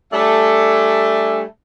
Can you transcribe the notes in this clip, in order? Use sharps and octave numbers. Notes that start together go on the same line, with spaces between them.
G3 A3 D4 A4 E5 G#5